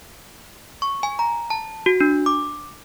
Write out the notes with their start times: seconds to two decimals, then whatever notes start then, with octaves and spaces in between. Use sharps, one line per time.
0.82 C#6
1.03 G#5
1.19 A#5
1.50 A5
1.86 F#4
2.00 D4
2.26 D6